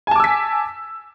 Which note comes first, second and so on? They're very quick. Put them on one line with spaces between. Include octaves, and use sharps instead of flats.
G#5 A5 D6 E6 B6